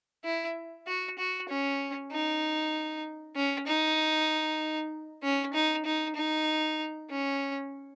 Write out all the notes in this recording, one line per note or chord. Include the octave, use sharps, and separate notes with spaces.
E4
F#4
F#4
C#4
D#4
C#4
D#4
C#4
D#4
D#4
D#4
C#4